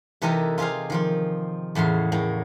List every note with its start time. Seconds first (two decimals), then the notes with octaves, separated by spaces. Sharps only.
0.22 C3 E3 D#4 G4 A4 A#4
0.58 F4 G4 G#4 C5 F5
0.90 D#3 F3 F4
1.75 E2 A2 C#3 C6
2.12 A2 A#3 G5